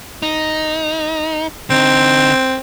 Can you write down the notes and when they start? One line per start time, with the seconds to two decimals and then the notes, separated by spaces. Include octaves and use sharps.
0.22 D#4
1.70 D3 C4 D#4